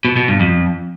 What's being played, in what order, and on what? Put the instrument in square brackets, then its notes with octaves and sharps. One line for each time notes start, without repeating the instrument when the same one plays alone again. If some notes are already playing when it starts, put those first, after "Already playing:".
[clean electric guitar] B2
B2
G2
F2